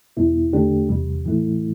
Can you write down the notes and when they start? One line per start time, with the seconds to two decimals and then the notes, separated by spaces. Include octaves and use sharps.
0.17 E2 B2 G3 B3 E4
0.53 E2 D3 A3 D4 G4
0.89 E2 C3 G3
1.25 A2 E3 A3 E4